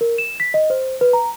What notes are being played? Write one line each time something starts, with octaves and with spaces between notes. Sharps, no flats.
A#4
E7
B6
D#5
C5
B4
A#5